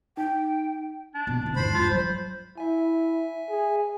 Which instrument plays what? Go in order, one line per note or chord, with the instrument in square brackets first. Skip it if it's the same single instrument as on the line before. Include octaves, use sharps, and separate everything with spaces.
[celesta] D#4 [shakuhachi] G5
[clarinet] D4
[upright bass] B2
D#2 C3
[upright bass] E2 G#2 [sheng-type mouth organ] C5 B5
[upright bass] C#2 [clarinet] F4
[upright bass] F#3 G3 [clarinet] C5
[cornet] E4 [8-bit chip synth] E5 G#5
[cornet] G#4